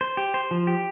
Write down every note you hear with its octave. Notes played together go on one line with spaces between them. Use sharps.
C5
G4
C5
F3
G4